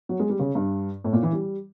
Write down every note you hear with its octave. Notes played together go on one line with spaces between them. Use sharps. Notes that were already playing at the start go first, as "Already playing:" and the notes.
F#3
G#3
G3
C#3
G2
A2
A#2
E3
G3